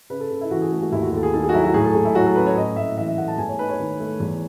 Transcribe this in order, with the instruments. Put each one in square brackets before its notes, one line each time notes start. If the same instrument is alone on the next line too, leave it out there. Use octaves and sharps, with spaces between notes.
[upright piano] C#3 B4
A4
C#3
E4
E3 F#4
G#4
A3
F#4
D#2 E4
F#4
D#2 A4
G#4
D#3 A4
G#4
F#4
F#3 E4
F#4
A2 G#4
A4
A2 G#4
E4
F#3 F#4
A4
C#4 B4
C#5
A2 D#5
A2 E5
E3 E5
E5
A3 F#5
A5
E2 G#5
C#5
D#4 B4
C#5
D#3
A3
E2